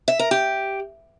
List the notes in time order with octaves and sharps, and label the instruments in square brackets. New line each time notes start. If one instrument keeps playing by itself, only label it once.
[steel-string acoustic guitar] E5
A#4
G4